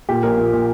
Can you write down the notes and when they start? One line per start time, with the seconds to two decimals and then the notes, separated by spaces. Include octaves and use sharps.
0.09 A#2 G4
0.23 A#1 A#4
0.37 A#2
0.53 A#2